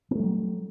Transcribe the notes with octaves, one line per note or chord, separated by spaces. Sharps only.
F#3 G3 A3 B3